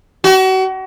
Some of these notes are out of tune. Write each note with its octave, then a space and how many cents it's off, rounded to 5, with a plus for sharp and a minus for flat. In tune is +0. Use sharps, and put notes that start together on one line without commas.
F#4 +35